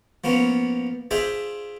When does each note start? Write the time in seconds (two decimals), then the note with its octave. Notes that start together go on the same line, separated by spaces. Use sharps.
0.24 F3 A#3 B3 C#4
1.11 D4 F4 G#4 C5 E5